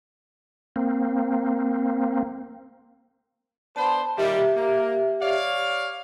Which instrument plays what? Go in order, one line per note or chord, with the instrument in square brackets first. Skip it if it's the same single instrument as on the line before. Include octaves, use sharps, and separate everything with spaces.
[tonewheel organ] A#3 C4
[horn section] B3 D4 C5 [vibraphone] A5 B5
[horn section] A#2 D#3 G3 [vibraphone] G4 E5
[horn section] A#3
C#5 D5 F5